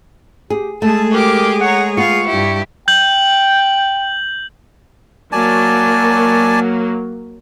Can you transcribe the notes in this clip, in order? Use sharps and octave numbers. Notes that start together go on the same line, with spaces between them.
G4 G#4
G#3 A3 G#4 A4 A5
G4 A#4 D6
C#5 F#5 A#5
B3 F4 F5 C#6
G2 E4 G4
G5 G6 F#7
F#3 A#3 D5 G#5 A5